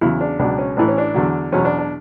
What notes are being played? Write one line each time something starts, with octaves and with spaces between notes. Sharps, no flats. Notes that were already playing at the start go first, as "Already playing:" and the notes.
E2 C#3 F#3 E4
D4
C#2 B2 F#3 D4
C#4
A1 A2 E3 D4
C#4
D4
E2 D3 F#3
E2 B2 F#3 C#4
D4
D4